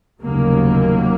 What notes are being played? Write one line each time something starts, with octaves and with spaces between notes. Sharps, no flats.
F1 D#2 C#3 F#3 A#3